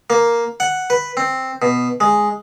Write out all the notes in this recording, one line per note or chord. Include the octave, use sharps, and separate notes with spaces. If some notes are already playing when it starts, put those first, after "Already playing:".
A#3
F#5
B4
C4
B2
G#3